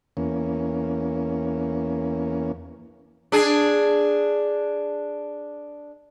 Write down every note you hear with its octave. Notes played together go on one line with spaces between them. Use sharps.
E2 A#3 C#4
D4 G#4